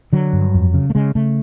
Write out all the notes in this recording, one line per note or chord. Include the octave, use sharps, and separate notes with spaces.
D3 F#3
G2
F2
C#3
A3
C#3 G#3
C#3 A3